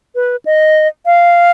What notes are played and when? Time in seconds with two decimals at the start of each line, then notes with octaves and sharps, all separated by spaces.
0.15 B4
0.46 D#5
1.06 F5